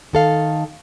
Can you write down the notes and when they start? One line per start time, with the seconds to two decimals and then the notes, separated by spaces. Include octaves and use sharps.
0.13 D#3 A4 F5